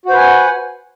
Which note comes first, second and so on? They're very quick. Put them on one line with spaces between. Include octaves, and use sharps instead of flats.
F#4 C5 B4 G#5 F#5